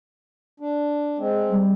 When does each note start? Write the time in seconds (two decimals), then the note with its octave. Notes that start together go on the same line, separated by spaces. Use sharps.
0.60 D4
1.18 G#3 C4
1.50 G3